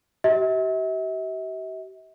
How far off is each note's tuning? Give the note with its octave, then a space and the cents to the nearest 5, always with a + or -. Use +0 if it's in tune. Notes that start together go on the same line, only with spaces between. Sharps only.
G4 -45 E5 -40